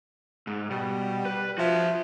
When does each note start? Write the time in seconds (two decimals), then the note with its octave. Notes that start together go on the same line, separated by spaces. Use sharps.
0.47 G#2
0.70 B2 G3
1.25 B4
1.58 F3 F#4 E5